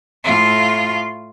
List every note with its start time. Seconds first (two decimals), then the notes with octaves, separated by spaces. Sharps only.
0.24 A2 F4